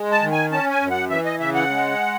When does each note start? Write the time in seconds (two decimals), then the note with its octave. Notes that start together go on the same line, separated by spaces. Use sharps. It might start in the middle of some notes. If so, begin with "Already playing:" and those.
Already playing: G#3
0.12 A5
0.22 D#3
0.32 G#5
0.52 C#4 A5
0.71 G#5
0.81 F#2
0.91 F#5
1.10 E3 E5
1.25 D#5
1.40 C#3 E5
1.55 F#5
1.70 G#3